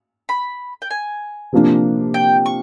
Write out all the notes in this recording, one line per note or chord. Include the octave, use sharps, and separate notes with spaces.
B5
G5
G#5
C3 F3 A#3 D4
G5
C#6